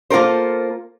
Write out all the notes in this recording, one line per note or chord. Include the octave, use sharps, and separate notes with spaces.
A#3 F4 A4 A#4 C5